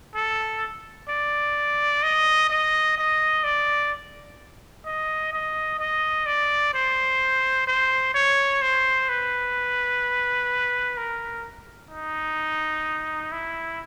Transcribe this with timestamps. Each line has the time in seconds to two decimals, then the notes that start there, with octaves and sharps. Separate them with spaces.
0.15 A4
1.09 D5
2.03 D#5
2.50 D#5
2.98 D#5
3.44 D5
4.85 D#5
5.33 D#5
5.80 D#5
6.27 D5
6.74 C5
7.67 C5
8.14 C#5
8.62 C5
9.09 B4
10.98 A#4
11.91 D#4
13.32 E4